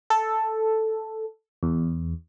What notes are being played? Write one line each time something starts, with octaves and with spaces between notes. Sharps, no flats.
A4
E2